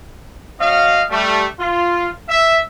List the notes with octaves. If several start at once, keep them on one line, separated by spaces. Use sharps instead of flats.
F#3 C#4 D#5 F5
G3 A3
F4
E5